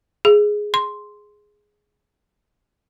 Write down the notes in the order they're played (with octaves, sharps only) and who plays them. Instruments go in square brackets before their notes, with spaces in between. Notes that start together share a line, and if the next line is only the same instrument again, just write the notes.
[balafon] G#4
C6